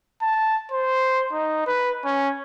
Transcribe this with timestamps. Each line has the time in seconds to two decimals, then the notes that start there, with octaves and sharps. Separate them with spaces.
0.22 A5
0.71 C5
1.33 D#4
1.67 B4
2.05 C#4